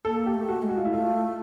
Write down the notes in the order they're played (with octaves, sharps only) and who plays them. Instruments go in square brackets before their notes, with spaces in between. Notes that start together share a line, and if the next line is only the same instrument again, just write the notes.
[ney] A#3 [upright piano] A4
[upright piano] G4
[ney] A3
[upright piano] F#4
[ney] G#3
[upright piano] F#4
F4
E4
[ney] A3 [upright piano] F4